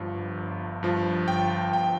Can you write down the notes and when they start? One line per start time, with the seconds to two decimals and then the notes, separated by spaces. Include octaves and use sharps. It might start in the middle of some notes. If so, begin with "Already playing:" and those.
Already playing: G1 G2 F3
0.37 G1
0.83 G2 F3
1.28 G1 G5
1.73 G2 F3 G5